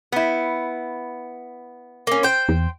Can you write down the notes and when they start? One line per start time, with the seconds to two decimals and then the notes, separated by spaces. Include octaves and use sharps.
0.12 B3 E4
2.07 A#3 C#4
2.23 C5 G5
2.49 E2